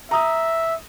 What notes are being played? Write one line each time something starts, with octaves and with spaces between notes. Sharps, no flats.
E5 A#5 D#6